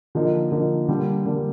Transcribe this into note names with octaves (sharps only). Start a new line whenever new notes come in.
D3 F3 A#3 D#4
D3 F3 A#3 D#4
D3 G3 A#3
D3 G3 A#3